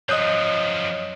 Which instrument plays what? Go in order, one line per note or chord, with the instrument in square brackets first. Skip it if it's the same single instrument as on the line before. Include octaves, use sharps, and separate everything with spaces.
[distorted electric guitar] F#2 F3 [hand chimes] C#5 D#5 [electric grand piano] D#6 F#6 G6